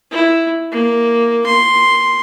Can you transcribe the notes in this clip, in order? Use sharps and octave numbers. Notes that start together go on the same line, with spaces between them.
E4
A#3
C6